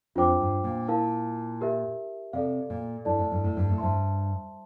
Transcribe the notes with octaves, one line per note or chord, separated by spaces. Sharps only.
F2 D4 F4 C5 G5 D6
G2
A#2
E4 A#4 F5 A5
G4 A#4 E5
C3 A4 D5 F5
A#2
G2 E4 A4 D5 A5
A2
G2
A2
G2
A2
G2 C5 E5 A5 C6